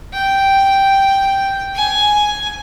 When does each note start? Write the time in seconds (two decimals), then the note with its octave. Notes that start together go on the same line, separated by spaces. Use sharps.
0.13 G5
1.75 G#5